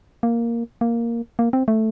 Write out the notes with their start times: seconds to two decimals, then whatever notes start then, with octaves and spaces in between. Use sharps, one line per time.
0.23 A#3
0.81 A#3
1.39 A#3
1.53 C4
1.68 A3